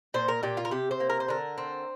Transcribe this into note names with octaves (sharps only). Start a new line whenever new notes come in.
A#2 C5
A#4
A#2 G4
F4
A#4
C3 G4
C5
A#3
A#4
C5
D3 A#4
C4